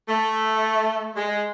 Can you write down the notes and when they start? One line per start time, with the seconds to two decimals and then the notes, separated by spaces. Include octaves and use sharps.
0.09 A3
1.16 G#3